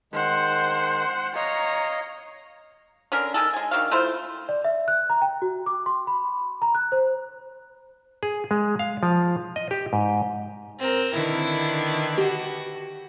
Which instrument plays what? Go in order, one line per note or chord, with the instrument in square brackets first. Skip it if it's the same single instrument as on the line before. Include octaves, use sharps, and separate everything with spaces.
[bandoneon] D#3 G#3 [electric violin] C5 F#5
[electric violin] C#5 A#5 [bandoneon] D#5 F5
[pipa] D3 C#4 A#4
D#3 G#3 G#4 A4
G#3 G#5
D#3 D4 F#4 F5
A3 E4 F4 C5
[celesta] D5
E5
F#6
A#5
G5
F#4
D6
C6
B5
A#5
F#6
C5
[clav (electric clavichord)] G#4
G#3
F5
F3
D#5
G4
G#2
[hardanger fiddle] C4 A#4
[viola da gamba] D3 D#3 B4 [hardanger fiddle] E4
[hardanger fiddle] F#4 [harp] G4